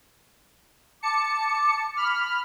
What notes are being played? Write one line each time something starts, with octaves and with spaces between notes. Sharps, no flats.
A5 D6 C#7
B5 F6